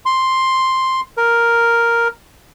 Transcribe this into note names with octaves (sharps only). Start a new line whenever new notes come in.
C6
A#4